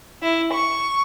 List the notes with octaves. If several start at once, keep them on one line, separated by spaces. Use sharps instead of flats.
E4
C#6